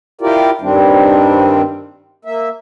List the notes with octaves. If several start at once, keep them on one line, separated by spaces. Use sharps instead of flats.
E4 F4 G4 A#4 D5
G2 D#3 G3 C4 D4
A#3 E5